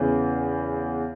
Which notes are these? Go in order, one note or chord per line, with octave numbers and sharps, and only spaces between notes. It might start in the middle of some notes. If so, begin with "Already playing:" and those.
Already playing: E2 C#3 E3